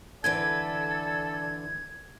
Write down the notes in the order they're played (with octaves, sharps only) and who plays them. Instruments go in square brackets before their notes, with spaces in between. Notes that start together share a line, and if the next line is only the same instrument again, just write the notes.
[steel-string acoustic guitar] D3 E3 B4 [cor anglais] A4 [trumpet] D5 [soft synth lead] G#6